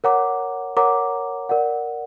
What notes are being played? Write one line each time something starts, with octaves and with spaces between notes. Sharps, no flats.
A#4 C#5 F#5 A#5 D6
A#4 C#5 F#5 A#5 D6
A#4 D5 F#5